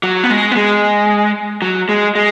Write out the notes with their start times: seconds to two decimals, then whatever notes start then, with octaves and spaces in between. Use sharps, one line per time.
0.03 F#3
0.24 B3
0.30 G#3
0.52 B3
0.56 G#3
1.62 F#3
1.89 G#3
2.15 G#3